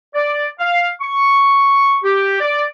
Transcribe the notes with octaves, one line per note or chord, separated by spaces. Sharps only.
D5
F5
C#6
G4
D5